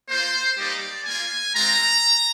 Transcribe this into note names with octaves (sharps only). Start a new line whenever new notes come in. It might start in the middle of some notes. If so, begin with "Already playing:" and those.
A#3 F4 C5
G3 A#3 D#4 G4 D5
A#3 F4 G#5
G#3 C4 F4 A#5